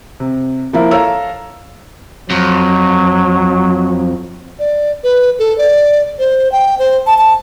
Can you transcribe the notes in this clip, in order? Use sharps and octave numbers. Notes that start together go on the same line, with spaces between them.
C3
F3 A#3 E4 A#4
A4 C#5 F5 A#5 E6
F2 F#3
D5
B4
A4
D5
C5
G5
C5
A5
A5